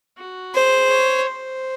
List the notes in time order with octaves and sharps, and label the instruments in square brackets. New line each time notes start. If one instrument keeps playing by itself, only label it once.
[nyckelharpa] F#4
[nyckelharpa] G#4 [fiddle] C5
[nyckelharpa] C#5
C5